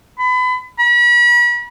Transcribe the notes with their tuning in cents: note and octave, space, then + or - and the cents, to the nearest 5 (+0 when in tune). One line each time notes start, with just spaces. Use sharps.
B5 +30
B5 -40